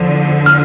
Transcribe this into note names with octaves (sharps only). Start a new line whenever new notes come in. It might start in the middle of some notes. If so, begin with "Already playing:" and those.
Already playing: E2 D3 F3
F6